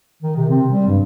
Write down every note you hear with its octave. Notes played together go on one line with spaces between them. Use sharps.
D#3
C3
C4
G3
G2